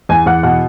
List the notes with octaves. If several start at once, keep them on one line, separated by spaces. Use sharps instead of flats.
E2 G#5
E2 F#5
B2 F#5